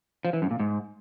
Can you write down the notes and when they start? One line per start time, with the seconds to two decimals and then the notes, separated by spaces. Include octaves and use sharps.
0.25 F3
0.33 E3
0.42 F#2
0.51 A#2
0.60 G#2